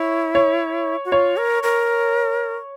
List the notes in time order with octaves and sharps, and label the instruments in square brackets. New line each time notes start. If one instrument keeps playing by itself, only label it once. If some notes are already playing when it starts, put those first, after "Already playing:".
Already playing: [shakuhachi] E4 [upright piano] C#5
[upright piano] C#5
[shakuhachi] F#4
[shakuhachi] F4 [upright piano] C#5
[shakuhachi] A#4
A#4